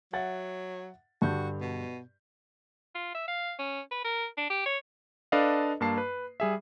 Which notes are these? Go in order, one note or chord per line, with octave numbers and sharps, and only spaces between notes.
F#3 E5 F#5 A6
G2 D3 F#4 G6
B2
F4
E5
F5
C#4
B4
A#4
D4
G4
C#5
D4 A4 B4 D5 D#5 F5
G2 A#3 A5 C7
B4
G3 G#4 E5